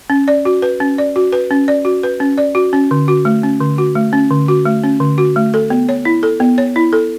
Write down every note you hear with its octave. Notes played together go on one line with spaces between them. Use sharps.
C#4
D5
F#4
B4
C#4
D5
F#4
B4
C#4
D5
F#4
B4
C#4
D5
F#4
C#4
D3
F#4
A3
C#4
D3
F#4
A3
C#4
D3
F#4
A3
C#4
D3
F#4
A3
A4
B3
C#5
E4
A4
B3
C#5
E4
A4